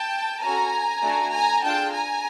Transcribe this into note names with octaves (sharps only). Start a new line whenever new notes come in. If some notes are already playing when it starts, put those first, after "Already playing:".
Already playing: G5 A5
C#4 F#4 A4 G#5 A#5
A3 D4 F#4 A4
G#5 A#5
D4 F4 G#4 G5 A5
G#5 A#5